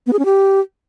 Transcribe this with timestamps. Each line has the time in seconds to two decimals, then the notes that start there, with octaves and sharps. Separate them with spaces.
0.07 B3
0.13 G#4
0.19 C#4
0.25 G4